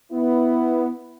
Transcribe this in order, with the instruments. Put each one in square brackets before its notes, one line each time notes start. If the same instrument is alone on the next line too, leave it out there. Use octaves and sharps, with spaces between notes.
[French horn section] B3 E4